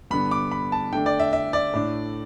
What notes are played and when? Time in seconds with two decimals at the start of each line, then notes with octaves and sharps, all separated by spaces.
0.11 G2 D3 B3 D4 B5
0.31 D6
0.52 B5
0.72 A5
0.92 D3 A3 D4 G5
1.06 D5
1.20 E5
1.33 E5
1.53 D5
1.74 A2 A3 D4